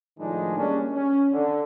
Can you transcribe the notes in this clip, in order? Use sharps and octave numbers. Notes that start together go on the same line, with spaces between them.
A2 D#3 F3 G#3 D4 D#4
G3 G#3 A#3 C#4 D4
C#4
D3